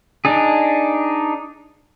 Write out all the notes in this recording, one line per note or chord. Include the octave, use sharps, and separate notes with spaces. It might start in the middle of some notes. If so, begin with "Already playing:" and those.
D4 D#4 G#4